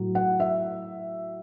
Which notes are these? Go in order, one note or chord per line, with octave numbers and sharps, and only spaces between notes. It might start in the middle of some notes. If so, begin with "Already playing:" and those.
Already playing: A2 F#3
F#5
E5